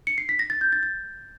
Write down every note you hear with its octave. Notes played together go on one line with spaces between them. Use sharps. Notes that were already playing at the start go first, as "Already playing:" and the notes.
C#7
C7
B6
A#6
A6
G6
A6
A6